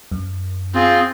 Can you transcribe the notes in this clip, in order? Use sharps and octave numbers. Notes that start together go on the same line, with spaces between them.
F#2
C4 F4 G#4